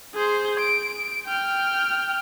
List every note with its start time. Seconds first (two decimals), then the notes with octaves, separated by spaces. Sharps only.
0.15 G#4 C5
0.59 D7
1.26 G5 F6